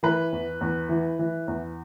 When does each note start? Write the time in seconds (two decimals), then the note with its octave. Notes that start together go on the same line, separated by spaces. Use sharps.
0.03 E3 B4
0.32 E2
0.61 E2
0.89 E3
1.19 E3
1.48 E2